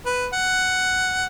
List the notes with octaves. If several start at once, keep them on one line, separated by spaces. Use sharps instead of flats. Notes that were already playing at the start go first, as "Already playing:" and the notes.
B4
F#5